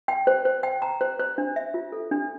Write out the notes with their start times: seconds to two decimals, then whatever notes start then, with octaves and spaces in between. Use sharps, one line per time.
0.08 G5
0.27 C5
0.45 C5
0.63 G5
0.82 A#5
1.01 C5
1.19 C5
1.38 D4
1.56 E5
1.74 F4
1.92 A4
2.11 D4